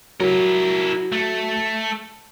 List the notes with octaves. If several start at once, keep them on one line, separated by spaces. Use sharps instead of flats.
F#3 E4 A#4
A3